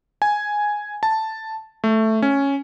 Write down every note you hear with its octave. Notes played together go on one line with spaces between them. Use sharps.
G#5
A5
A3
C#4